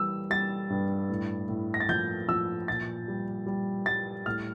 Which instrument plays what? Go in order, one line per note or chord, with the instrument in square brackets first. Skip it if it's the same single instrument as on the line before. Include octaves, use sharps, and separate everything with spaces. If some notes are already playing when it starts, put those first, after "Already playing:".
Already playing: [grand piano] E3 G3 E6
G3 A6
G2
A2
A2
A#6
A6
F3 G6
F3 E6
A#2 A6
G3
G3
G3 A6
A2 F6